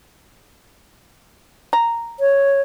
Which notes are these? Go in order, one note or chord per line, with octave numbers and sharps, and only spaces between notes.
A#5
C#5